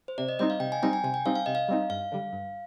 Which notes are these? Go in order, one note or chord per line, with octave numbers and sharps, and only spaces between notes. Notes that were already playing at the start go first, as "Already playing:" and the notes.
C5
C3 D5
D#5
G3 C4 D#4 D#5
F5
C3 G5
G#5
G3 C4 D#4 G5
G#5
C3 G#5
G5
G3 C4 D#4 F5
F5
C3 D#5
F5
G3 C4 D#4
G2 F5
D3 G3
G2